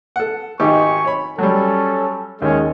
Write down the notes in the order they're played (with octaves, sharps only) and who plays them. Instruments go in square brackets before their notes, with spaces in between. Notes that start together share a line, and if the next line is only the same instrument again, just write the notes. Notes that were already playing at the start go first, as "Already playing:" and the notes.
[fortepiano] A4 F#5
[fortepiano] G#1 D#4 G4 [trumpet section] G#5 C#6
[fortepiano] C#5 B5
[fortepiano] F#3 G3 [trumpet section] C#4 A4
[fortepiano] D#2 [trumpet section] G#3 C#4